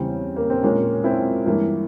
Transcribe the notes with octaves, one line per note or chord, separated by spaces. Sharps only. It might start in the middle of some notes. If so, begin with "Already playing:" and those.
Already playing: E2 C#3 G3 C4
A#3
C4
A#2 F3 G#3 A#3 C#4
C4 E4
G2 E3 G#3 A#3